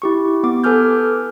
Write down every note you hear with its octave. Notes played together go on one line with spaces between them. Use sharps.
E4 G4 C#6
B3 D6
A4 B4 G#5 D6 F6 G6